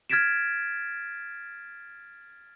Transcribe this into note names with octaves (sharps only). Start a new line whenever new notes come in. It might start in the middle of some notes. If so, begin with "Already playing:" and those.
F6 G#6 A6 B6 D7 E7